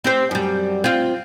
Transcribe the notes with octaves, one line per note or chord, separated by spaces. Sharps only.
C4 G4 C5
F#2 G3
C4 F4